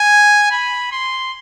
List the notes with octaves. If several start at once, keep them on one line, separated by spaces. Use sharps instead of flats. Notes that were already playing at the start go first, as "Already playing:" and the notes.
Already playing: G#5
B5
C6